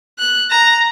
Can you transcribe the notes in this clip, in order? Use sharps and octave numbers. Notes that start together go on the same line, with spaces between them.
F#6
A#5